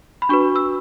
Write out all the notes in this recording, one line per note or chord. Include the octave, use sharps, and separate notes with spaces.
B5
D4 F#4 B4 C#6
E6